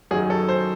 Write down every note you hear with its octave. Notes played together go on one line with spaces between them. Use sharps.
F#2 D#3 F#3 G#4
A4
C5